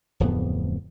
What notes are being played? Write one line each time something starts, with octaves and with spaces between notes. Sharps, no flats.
D1 F2 A2 B3